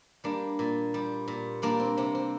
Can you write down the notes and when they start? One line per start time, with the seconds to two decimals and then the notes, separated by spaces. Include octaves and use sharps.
0.24 G3 A#3 D4
0.59 A#2
0.94 G3
1.28 A#2
1.62 G3 A#3 D4
1.80 C4
1.97 C3 C4
2.15 C4